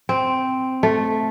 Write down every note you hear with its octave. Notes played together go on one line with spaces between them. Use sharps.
C4
A3